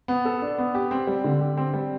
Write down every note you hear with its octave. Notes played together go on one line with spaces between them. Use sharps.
B3
A4
D4
B3
G4
C4
G3
D3
G4
C4
G3